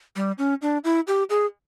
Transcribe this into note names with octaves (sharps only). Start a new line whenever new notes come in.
G3
C#4
D4
E4
G4
G#4